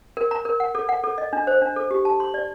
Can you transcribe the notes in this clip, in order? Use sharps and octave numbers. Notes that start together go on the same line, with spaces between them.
A#4
A#5
A#4
F#5
A4
F#5
A4
D#5
D4
C5
D4
A4
G4
A5
C6
D5